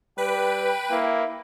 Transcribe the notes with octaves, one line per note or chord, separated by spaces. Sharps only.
G3 B4 G5
A#3 E4